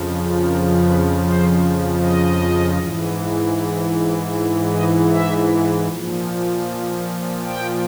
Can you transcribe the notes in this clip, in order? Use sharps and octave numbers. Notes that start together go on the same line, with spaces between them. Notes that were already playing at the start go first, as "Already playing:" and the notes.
Already playing: F2 C#3 F3
A#4
B4
C5
D#5
G#2 E3
D#5
E5
A#2 F3
G5